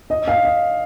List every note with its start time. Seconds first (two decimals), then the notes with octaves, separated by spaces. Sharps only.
0.10 D#5
0.28 F5
0.45 D#5